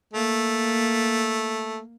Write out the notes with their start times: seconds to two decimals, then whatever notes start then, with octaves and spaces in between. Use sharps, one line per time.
0.13 A3 A#3